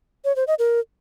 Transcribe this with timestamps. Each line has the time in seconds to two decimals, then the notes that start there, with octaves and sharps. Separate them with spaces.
0.25 C#5
0.36 C5
0.47 D#5
0.59 A#4